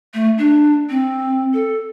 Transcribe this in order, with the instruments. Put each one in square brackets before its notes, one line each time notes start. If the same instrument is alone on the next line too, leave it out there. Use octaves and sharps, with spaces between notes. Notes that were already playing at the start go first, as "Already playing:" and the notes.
[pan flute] A3
D4
C4
A4